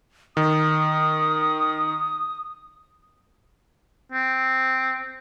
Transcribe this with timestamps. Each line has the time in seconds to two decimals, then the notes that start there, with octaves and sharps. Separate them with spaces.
0.37 D#3 D#6
4.12 C4